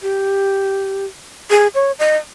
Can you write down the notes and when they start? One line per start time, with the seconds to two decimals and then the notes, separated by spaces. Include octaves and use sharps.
0.02 G4
1.50 G#4
1.75 C#5
1.99 D#5